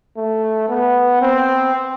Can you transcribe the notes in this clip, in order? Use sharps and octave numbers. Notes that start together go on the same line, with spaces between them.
A3
B3
C4